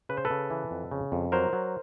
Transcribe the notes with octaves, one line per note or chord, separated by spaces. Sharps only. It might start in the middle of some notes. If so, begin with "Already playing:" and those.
C#3 B4
C5
A4 B4
C#3
E3
F2
C#3
F2
F#3 A#4 C5
F#3